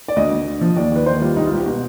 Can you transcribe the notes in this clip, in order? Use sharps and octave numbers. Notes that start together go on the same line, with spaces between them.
D5
D2 D#5
D2
D3
F3
D#2 D5
D#2 B4
D#3 C5
G3 F4
C2 D#4
F4
C2
G4
B2